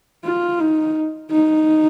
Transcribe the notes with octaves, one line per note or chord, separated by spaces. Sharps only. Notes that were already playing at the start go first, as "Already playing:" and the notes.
F4
D#4
D#4